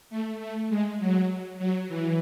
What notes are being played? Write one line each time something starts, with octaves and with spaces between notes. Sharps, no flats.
A3
A3
G#3
F#3
F#3
E3